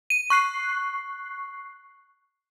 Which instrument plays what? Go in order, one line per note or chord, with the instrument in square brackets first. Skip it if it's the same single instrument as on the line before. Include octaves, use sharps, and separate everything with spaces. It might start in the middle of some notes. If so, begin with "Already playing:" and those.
[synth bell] D#7
C#6 F#6 C7